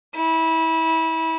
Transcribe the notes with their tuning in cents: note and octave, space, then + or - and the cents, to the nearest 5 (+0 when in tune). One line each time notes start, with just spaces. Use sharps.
E4 -25